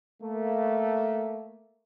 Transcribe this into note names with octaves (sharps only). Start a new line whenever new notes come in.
A3 A#3